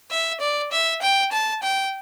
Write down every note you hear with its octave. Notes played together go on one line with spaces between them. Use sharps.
E5
D5
E5
G5
A5
G5